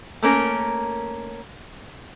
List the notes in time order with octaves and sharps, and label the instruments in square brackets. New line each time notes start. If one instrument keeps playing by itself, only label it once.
[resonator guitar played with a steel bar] A3 A#3 C#4 A#4